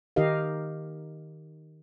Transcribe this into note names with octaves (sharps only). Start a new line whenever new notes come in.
D#3 D#4 G4 A#4 D#5 F5